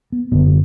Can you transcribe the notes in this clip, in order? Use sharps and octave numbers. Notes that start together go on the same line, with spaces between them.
B3
F#1 F#2 D3 B3